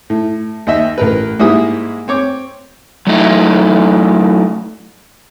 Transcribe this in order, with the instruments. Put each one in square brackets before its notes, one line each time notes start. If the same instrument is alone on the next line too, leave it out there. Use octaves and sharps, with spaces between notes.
[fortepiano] A2
D#2 D#5 E5
A1 A#4 B4
G#2 G3 G#3 A#3 E4 D#6
C4 C#5 D6
[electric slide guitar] F#3 A3 D#4 E4